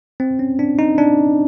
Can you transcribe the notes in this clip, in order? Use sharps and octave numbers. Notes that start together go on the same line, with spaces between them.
C4
C#4
D4
D#4
D4